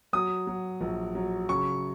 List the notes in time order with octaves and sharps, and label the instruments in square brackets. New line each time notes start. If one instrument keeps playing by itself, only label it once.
[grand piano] F#3 D#6
F#3
A#1
F#3
C#3 C#6